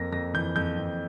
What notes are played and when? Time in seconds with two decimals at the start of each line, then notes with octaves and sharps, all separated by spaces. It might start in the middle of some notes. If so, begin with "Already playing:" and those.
Already playing: F2 A#3 A#6
0.12 F2 A#6
0.34 E3 G6
0.56 F2 G6
0.78 F2